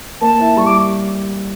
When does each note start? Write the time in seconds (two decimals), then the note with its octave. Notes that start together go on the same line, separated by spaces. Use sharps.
0.21 A#3 A5
0.39 E4
0.57 G3 C#6
0.66 D6